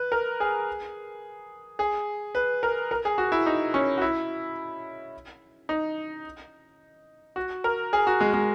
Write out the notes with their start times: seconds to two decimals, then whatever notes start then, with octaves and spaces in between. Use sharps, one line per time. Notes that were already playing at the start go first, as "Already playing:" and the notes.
Already playing: B4
0.12 A#4
0.40 G#4
1.79 G#4
2.35 B4
2.63 A#4
2.91 A#4
3.05 G#4
3.18 F#4
3.32 E4
3.46 D#4
3.74 C#4
3.98 F#4
4.02 E4
5.69 D#4
7.36 F#4
7.64 A#4
7.93 G#4
8.07 F#4
8.21 G#3
8.34 G#3